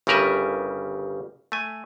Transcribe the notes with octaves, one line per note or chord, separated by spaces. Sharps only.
G1 C#3 G3 A#4 B4 E5
A3 G#5